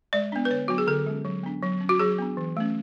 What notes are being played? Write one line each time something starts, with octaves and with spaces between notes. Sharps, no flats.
G#3 D5
B3 D4
B4
D3 C#5
F#3 B3 D4 F#4
G#4
D3 A4
G#3 C#4
F#3
B3 D4
F#3
C#4
F#4
F#3 G#4
B3 D4
E3
A3 C#4